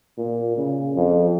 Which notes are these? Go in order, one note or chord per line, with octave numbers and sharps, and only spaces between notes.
A#2
C#3
F2